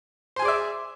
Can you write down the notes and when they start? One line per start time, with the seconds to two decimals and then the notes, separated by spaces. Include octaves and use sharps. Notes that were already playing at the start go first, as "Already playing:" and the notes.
0.36 C5
0.39 G#5
0.42 G#4
0.45 D5
0.48 E5